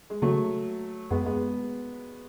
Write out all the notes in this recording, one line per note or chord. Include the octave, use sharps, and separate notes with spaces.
G#3
C#3 F#3 A3
F#2 G#3 B3
G#3 B3